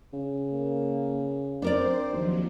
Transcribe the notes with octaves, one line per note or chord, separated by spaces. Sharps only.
C#3
A#3
C4 D4 A#4 C5 D5
D#2 F3 F#3